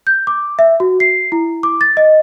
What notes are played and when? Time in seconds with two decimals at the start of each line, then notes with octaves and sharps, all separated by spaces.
0.07 G6
0.27 D6
0.59 E5
0.80 F#4
1.00 C7
1.32 E4
1.63 D6
1.81 A6
1.97 D#5